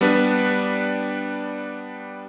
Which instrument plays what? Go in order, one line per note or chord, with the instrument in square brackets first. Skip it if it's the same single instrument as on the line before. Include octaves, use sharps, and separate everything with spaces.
[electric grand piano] G3 B3 D4 B4